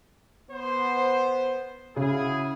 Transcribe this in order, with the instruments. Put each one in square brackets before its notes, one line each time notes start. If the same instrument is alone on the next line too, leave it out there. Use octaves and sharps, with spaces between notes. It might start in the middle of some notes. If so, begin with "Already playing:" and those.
[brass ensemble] B3 C5
[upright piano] C#3 [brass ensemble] E4 F#4 G#4